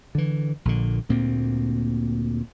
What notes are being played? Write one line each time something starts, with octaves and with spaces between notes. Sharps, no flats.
D3 E3
A#1 A#2 D3
D2 A#2 A#3 C4